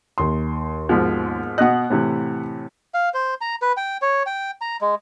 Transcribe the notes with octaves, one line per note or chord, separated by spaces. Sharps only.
D#2 C6
G#2 B2 F3
B2 D#5 F#5 F#6
A2 C3 E3
F5
C5
A#5
B4
G5
C#5
G5
A#5
G#3